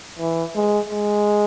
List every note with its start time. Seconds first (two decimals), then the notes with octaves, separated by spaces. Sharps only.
0.19 E3
0.55 G#3
0.90 G#3